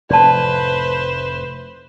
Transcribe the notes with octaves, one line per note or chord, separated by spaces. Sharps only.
F1 A2 B4 C5 D5 A5